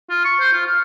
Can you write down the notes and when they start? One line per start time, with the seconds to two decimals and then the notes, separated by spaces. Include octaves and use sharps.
0.10 F4
0.24 C#6
0.40 C5
0.53 F4
0.66 F5